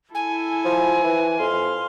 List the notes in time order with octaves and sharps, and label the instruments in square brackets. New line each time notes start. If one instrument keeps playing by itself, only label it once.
[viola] E4 A4 [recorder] G#5
[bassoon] F3
E3
[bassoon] F2 [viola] F5 C6